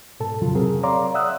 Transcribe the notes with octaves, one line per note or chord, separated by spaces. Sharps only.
G#2 B2 A4 A5
C2 F2 A#2 C#3 F#3 F4
C3 F#3 C4 G#4 A#4
C#5 D5 F5 A#5 C6 D6
D5 E5 F#5 D#6 E6 F#6